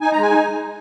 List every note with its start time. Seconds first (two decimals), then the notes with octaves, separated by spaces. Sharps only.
0.01 D#4 G#5
0.12 G#3 A#5
0.22 G#5
0.30 D#4